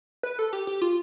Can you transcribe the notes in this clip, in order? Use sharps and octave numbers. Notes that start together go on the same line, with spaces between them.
B4
A4
G4
G4
F4